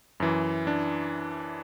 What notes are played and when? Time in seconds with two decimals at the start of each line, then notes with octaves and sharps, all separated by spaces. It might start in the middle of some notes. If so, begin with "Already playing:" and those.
0.20 F#2 E3
0.67 D4